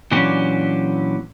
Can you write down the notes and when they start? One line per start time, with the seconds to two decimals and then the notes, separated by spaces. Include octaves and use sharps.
0.11 A#2 E3 F#3 C#4 D4 G4